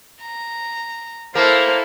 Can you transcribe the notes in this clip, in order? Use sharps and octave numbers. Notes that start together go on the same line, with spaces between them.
A#5
A#3 E4 A4 C5 F5 A5